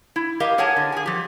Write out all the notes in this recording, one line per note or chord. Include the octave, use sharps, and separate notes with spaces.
E4
G4 A#4 D#5 F5
G#4 A#4 C#5 F#5 G#5 A5
D3
G#4 G#5
F3 G4